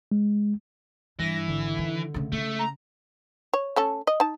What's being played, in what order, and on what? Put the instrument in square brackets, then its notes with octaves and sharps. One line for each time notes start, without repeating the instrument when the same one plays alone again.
[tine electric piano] G#3
[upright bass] G2 [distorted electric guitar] E3 [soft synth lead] A#6
[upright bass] G#1 [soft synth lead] D3
[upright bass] D#3
C#3 A3
[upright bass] C#3 [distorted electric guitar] A3
[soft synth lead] A#5
[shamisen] C#5
A3 C#4 A4
D#5
D#4 A5